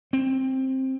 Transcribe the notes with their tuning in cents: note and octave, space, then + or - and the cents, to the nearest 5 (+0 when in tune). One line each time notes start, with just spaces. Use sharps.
C4 +10